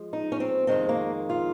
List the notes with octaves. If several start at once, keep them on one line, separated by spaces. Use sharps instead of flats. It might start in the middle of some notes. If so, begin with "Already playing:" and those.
Already playing: F3 G#3
D#4
C#4
C4
F2 D#3 G#3 C4
A#3
F4